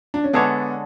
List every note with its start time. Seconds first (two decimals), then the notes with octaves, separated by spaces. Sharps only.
0.14 D4
0.24 C#4
0.33 D3 G#3 B3 D4 A4 C#5